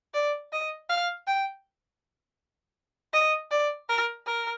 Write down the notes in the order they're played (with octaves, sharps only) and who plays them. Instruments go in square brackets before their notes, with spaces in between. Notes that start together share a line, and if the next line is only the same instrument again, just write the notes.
[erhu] D5
D#5
F5
G5
D#5
D5
A#4
A#4